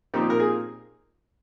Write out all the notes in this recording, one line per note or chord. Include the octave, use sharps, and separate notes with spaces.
A#2 F3 C4 D#4 G4
A#4
G#4